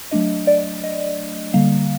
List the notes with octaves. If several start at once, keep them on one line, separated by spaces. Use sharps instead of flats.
F#3 A3 D4 D#5
D5
D#5
D3 G3 A#3 F5